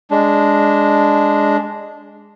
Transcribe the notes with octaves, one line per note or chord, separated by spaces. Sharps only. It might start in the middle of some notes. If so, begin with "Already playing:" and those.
G#3 D4